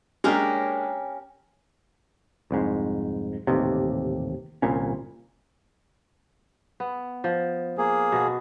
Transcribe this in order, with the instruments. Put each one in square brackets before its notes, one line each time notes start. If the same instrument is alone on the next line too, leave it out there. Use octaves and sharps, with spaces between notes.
[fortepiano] G#3 A#3 D4 [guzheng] C#4 G4 A#4
[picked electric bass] C2 F2 G#2
D#1 A1 D#2 C3
G1 C2 A#2 C#4
[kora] B3
F3
[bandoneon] A#3 G#4
[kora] B2 F#4